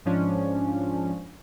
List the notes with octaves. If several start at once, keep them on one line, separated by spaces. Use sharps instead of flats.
G#2 F3 C#4 D4